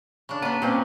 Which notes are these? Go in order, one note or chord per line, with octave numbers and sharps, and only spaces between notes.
C#3 D4 C#6
A#3 B3 C#4 D4 B4
A#2 G3 C4 C#4